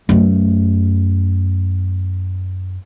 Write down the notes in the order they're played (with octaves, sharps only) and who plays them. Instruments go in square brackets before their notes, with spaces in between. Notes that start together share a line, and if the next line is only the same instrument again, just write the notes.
[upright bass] F#2 A3